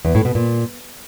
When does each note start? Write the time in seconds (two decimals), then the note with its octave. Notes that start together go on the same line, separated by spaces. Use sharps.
0.05 E2
0.15 A2
0.25 B2
0.35 A#2